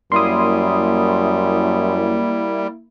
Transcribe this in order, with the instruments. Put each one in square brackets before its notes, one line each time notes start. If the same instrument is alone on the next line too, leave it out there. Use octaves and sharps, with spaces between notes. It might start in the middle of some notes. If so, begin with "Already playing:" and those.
[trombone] F#2 [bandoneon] G3 [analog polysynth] A#3 E4 [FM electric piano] C6 D#6